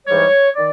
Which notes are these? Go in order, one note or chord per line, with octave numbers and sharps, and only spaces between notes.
G#2 E3 G3 C#5
D#3 D5